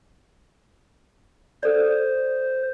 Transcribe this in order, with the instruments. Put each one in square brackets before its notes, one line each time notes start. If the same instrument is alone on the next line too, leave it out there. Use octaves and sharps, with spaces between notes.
[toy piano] A4 D5 [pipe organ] C5